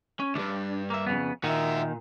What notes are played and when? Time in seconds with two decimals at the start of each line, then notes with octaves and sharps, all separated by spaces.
0.20 C#4
0.36 D2 G2 D4
0.90 A#3 E5
1.07 F2 C#3 B3
1.44 A#2 D#3 F#4 E5